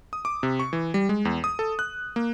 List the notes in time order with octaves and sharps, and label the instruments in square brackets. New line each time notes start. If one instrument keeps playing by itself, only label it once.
[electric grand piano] D#6
D6
C3
C#6
E3
G3
G#3
E2
D#6
A4
F#6
A#3